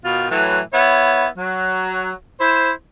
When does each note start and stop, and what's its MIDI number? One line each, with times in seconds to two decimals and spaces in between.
0.04 0.29 47
0.04 0.29 51
0.04 0.29 65
0.30 0.60 45
0.30 0.60 52
0.30 0.60 54
0.73 1.27 59
0.73 1.27 64
0.73 1.27 73
1.36 2.12 54
2.39 2.70 64
2.39 2.70 72